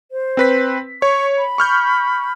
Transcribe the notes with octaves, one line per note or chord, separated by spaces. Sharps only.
C5
C4 B4 B6
C#5 C#6
B5
C#6 F6 G6